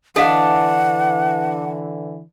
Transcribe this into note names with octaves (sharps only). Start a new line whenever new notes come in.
D3 E3 D4 A4 D#5 F5 F#5